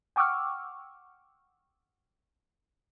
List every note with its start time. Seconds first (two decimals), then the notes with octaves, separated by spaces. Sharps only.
0.16 F#5 G5 C#6 D6 E6 F6